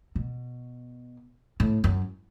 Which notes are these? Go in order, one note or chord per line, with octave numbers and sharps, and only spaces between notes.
B2
A2
F#2